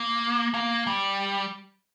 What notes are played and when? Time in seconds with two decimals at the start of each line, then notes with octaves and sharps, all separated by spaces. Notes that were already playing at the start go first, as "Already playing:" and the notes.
Already playing: A#3
0.54 A#3
0.87 G3